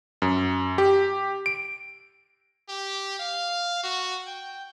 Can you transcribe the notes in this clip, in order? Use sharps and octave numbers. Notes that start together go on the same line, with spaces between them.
F#2
G4
D7
G4
F5
F#4
G5